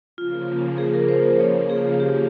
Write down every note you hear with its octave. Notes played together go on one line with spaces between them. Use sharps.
C#3 F3 A#3 F4
G#4
A#4
C5
C5
C#5
G#4
F4
G4